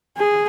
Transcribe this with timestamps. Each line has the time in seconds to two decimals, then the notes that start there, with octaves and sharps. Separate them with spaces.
0.17 G#4